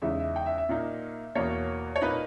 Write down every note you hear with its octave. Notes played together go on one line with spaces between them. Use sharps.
E2 C#3 G#3 D#4 E5
E5
G5
E5
E5
A#2 A#3 D#4
E2 B2 A#3 C#5
C#5
A#2 A#3 D#4 B4